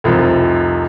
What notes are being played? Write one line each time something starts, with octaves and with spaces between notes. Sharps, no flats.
F1 C2 F3